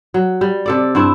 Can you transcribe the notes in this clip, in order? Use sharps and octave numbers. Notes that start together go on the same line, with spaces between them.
F#3
G3
C3 A4 D5
G2 C4 E4